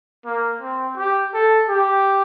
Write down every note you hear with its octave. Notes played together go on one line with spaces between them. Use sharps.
A#3
C4
G4
A4
G4